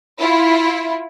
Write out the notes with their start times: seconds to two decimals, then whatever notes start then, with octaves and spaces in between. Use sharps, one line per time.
0.19 E4 F4